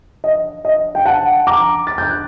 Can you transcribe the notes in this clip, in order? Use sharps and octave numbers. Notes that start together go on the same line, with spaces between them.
D#5
D#5
G5
F#5 A5
A#5 D6
A6
G6
F#6